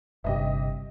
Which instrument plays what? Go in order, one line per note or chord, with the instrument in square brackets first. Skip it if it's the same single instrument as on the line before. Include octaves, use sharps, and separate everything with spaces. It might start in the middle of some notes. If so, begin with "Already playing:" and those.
[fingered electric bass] G1 G2 C3 [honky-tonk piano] G4 D#5 E5